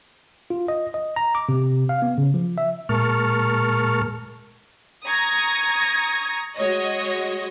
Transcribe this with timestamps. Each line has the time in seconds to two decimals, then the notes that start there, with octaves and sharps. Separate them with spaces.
0.50 F4
0.68 D#5
0.94 D#5
1.16 A#5
1.35 D6
1.49 C3
1.89 F5
2.02 B3
2.18 C#3
2.34 F3
2.58 E5
2.89 A#2 G#3 A#4 A5 C#6 F6
5.05 A#5 C#6 D#6 G#6 A#6
6.57 G#3 F#4 C#5 D#5